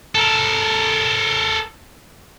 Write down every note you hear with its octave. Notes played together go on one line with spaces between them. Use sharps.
A4 A#4